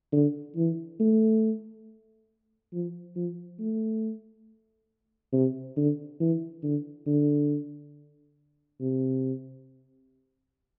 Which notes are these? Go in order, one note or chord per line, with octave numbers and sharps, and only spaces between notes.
D3
E3
A3
F3
F3
A3
C3
D3
E3
D3
D3
C3